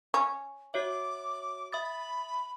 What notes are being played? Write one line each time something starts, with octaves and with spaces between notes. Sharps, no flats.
C#4
F#4 C#5 E5 D6
E5 B5 D#6 A6